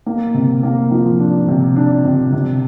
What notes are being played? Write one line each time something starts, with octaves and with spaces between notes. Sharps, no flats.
A#3
C3
A#3
F3
D4
C3
D4
C3
C3